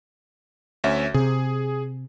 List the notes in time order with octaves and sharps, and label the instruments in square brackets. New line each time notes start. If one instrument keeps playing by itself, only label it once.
[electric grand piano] D2 C#4 E5
[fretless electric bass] C3 [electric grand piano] G#4